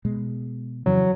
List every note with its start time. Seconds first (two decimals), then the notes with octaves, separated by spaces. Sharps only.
0.05 B2 G#3
0.86 F2 C#3 E3 F#3